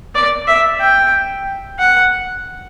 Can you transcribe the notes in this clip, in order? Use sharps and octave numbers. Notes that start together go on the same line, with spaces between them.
D5
E5
G5
F#5